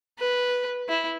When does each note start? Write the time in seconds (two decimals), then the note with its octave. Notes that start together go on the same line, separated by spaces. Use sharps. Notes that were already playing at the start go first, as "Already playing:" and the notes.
0.19 B4
0.89 E4